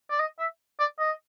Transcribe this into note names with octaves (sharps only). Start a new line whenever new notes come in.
D5
D#5
E5
D5
D#5